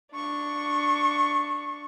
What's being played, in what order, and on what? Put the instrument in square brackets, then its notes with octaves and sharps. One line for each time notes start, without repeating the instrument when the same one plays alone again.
[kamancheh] D4 C#6